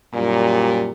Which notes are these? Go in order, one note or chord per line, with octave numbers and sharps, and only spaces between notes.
F#2 A#2 G3